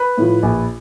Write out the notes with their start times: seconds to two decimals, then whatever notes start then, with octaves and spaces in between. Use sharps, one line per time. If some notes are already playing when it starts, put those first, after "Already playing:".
Already playing: B4
0.18 A2 F3
0.43 A#1